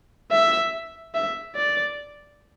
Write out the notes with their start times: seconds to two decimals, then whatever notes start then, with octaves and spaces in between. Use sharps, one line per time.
0.32 E5
1.15 E5
1.56 D5